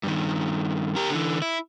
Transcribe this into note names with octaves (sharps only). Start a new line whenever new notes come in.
G2 D#3
G4 A#4
D3 E3
E4